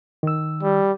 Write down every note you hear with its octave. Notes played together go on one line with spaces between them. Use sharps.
D#3 E6
G3